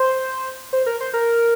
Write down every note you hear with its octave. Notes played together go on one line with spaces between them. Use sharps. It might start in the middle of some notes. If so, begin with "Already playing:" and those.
Already playing: C5
C5
A#4
C5
A#4